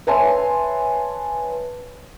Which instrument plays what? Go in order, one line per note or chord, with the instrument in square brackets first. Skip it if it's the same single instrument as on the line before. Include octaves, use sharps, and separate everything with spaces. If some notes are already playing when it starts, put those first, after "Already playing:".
[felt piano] B4 C#5 E5 G#5 A5 C6